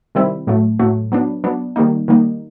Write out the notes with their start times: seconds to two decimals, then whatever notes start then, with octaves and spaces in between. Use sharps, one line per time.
0.15 C3 D#3 G3 C4 E4
0.47 A2 F#3 A3
0.79 A2 F#3 A3
1.12 F#3 B3 D4
1.44 F#3 B3 D4
1.76 D#3 G3 A#3 D#4
2.08 D#3 G3 A#3 D#4